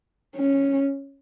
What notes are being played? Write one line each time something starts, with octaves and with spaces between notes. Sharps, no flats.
C#4